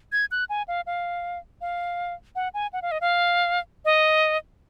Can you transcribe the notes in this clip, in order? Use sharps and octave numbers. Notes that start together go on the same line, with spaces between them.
G#6
F#6
G#5
F5
F5
F5
F#5
G#5
F#5
F5
D#5
F5
D#5